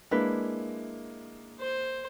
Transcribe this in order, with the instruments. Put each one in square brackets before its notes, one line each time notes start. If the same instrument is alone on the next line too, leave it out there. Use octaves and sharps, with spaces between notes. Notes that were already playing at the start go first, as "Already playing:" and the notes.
[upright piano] G#3 A#3 [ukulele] D4 E4 B4
[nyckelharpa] C5